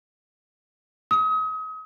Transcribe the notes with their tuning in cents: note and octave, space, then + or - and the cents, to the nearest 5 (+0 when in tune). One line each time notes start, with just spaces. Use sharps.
D#6 +35